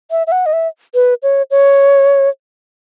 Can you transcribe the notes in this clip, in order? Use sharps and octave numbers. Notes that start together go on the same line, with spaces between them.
E5
E5
F#5
D#5
E5
B4
C#5
C#5